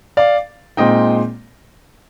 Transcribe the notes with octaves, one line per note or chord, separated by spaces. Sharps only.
D5 F5
A#2 G#3 C4 D#4 D#5 G5